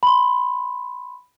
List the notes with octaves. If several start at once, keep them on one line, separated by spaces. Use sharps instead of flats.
B5 C6